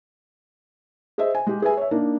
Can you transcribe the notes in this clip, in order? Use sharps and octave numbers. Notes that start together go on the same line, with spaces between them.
G#4 C5 D#5 E5
G#5
G#3 G4
G#4 B4 E5 G#5
C#5 E5
A#3 D4 D#4